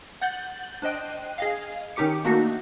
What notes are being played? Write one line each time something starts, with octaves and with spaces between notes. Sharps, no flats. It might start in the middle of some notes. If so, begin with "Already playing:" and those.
F#5 G6 A6 F#7 G7
D4 C5 D#5 G5 F#6
G#4 D#5 F5
D#3 C#4 D#4 G4 D6 C#7
A3 A#3 D4 D#4 F#4 A4